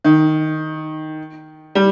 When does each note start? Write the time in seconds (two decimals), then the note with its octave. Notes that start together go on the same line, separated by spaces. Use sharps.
0.05 D#3
1.75 G3